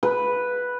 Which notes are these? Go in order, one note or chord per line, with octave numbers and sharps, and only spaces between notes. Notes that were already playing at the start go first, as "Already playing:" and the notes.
B4